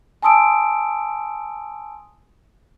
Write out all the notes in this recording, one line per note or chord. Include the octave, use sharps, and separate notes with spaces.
G#5 A5 C6 D#6 E6 D7